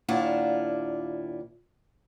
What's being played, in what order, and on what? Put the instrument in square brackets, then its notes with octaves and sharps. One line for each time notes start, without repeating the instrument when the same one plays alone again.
[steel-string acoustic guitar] D#2 A#2 D4 E4 F4 F#5